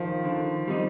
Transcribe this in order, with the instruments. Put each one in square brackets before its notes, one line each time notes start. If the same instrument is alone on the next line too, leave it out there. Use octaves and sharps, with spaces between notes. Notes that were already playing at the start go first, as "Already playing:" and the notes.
Already playing: [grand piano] D#3 F3
[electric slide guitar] D3
G3 C4 D#4